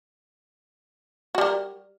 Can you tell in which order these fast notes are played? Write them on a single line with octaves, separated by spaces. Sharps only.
F#4 G3 A#4